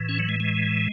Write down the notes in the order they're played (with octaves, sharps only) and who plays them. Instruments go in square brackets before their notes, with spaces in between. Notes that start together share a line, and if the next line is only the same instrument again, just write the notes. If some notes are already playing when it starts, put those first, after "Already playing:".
Already playing: [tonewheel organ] A2 E3
C#4
F#3
G#3
G#3